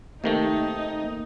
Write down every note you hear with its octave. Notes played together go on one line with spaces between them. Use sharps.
C3 D#3 A3 A#3 D#4